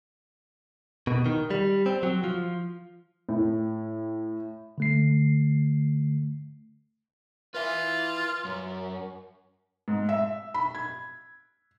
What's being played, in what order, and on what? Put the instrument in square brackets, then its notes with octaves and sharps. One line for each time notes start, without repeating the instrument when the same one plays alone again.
[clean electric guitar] B2
D#3
G3
C4
F#3
F3
[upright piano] A2
[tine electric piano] D3 A3 C7
[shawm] F4 [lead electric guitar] B4 E5
[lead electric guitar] F#2
[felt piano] G#2
E5
B5
G#6